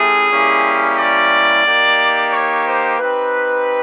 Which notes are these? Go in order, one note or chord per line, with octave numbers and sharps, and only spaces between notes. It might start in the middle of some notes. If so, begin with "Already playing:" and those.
Already playing: A3 C#4 E4 G4 G#4
G3 A#3 C#4 E4 G4
D5
A#3 D#4 G4
C#5
C5
C4 D#4 G4 B4